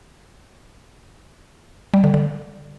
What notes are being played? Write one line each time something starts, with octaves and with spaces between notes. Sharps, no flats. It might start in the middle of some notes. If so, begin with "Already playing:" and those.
G3
D3
D3